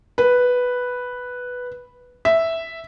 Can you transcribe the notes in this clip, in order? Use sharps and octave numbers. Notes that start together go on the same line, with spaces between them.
B4
E5